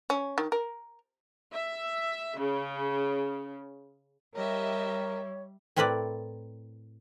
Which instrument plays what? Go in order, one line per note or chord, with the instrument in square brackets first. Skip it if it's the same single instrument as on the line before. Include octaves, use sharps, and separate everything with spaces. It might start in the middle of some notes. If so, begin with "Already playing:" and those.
[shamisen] C#4
D#3
A#4
[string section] E5
C#3
[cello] G3 [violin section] G4 D#5 E5 [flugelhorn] A#4 [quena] C#5
[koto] A2 C4 E4 A#4 B4 D5